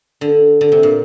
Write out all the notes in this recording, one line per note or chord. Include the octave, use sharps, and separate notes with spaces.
D3
D3
C3
A#2